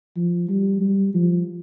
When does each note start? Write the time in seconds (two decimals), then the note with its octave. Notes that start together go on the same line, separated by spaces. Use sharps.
0.16 F3
0.49 G3
0.81 G3
1.14 F3